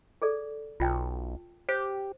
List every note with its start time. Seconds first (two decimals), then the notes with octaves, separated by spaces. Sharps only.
0.22 G#4 A4 D5
0.80 B1 F4 G5 A5
1.69 G4 C5